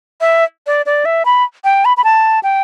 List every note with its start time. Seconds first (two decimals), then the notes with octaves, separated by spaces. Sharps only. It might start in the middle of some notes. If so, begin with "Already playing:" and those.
0.21 E5
0.67 D5
0.86 D5
1.05 E5
1.25 B5
1.64 G5
1.85 B5
1.97 B5
2.04 A5
2.43 G5